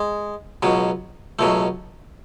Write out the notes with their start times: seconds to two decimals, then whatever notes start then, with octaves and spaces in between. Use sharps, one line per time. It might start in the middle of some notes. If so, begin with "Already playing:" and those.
Already playing: G#3
0.63 C#2 B2 F#3
1.39 C#2 B2 F#3 A3